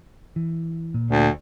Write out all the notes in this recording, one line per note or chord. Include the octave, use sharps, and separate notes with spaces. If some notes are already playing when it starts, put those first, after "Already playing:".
E3
A#2
D2